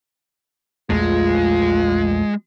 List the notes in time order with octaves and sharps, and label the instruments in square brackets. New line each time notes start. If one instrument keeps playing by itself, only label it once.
[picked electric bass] A#1 E2 A3 [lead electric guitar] G#3 [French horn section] F4